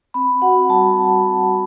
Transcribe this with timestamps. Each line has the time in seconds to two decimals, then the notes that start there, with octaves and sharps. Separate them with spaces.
0.14 C4 B5
0.42 F#4 F#5
0.69 G3 A5